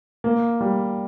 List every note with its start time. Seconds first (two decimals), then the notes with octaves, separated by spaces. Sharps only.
0.24 A#3
0.61 G3